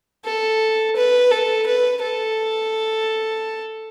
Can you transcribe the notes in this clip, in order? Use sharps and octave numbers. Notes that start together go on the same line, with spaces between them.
A4
B4
A4
B4
A4